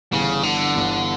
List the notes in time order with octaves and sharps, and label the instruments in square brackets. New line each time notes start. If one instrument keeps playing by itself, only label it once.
[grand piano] G1 G2 E3 B3 [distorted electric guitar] C#3
[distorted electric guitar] D3
[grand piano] G1 G2 E3 B3